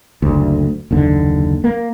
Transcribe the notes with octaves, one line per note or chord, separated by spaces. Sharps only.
F#1 D2
F#1 D#2 D3
A#3